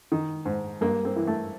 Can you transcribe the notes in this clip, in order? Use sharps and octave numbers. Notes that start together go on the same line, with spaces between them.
D#3
G#2
G2 A#3
C4
E3
A3